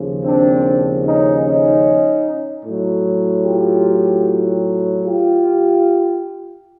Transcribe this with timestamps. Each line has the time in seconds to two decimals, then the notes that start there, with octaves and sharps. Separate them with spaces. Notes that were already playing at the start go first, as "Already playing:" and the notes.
Already playing: D#2 C#3 F3
0.24 C4 D4
1.04 C#4 D#4
1.44 C#4 D#4
2.64 A2 F#3
3.44 F4 G4
5.04 F4 G4